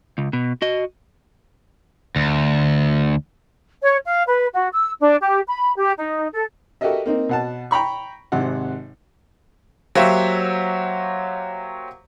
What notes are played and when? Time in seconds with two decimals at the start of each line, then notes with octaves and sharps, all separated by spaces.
0.18 C#2
0.33 B2
0.62 F#4 D#5
2.16 D2
3.82 C#5
4.06 F5
4.27 B4
4.53 F#4
4.71 E6
4.99 D4
5.21 G4
5.48 B5
5.76 G4
5.97 D#4
6.32 A4
6.81 F#4 G4 A4 A#4 D#5 E5
7.06 A#3 C4 D#4
7.29 B2 F#5 A5
7.71 G5 A#5 B5 C#6
8.32 G#1 C3 F#5
9.95 F#3 A#3 G4 C5 C#5 E5